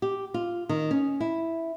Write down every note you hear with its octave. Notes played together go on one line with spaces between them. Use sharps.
G4
F4
D#3
C#4
E4